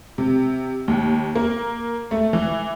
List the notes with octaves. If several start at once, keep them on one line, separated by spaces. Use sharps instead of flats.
C3
D#2
A#3
A3
E3